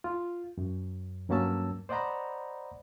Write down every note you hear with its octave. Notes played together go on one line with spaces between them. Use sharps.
F4
F#2
G2 F#3 A#3 C#4 A5 E6
C5 D5 D#5 F#5 A#5 B5